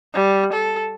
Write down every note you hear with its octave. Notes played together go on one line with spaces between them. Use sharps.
G3
A4